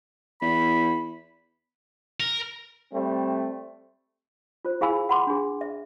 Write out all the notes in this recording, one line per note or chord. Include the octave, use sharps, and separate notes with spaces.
E2 B5
A#4
G3 A3 C4
F4 C5
E4 G#4 F5 G#5 B5 E6
F#5 B5 C6 D6
D4 G#4
E5